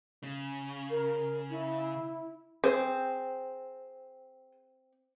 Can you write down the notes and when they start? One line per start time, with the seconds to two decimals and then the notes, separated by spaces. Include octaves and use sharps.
0.23 C#3
0.90 A#4
1.50 E4
2.64 C4 G#4 C5